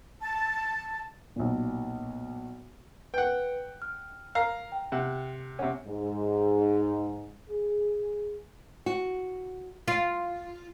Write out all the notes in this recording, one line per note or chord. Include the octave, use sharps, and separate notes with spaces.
A5
B1 A#2
B4 F#5 G5
F6
A#4 F5 A#5
G5
C3 F#5
C3 C#4 F#5
G#2
G#4
F#4
F4